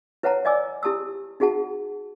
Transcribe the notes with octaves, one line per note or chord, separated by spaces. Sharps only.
E4 B4 C#5 F#5 A5 A#5
D5 D#5 G#5 D6 E6
E4 G4 A5 D#6 E6
D#4 F#4 G#4 F#5 A5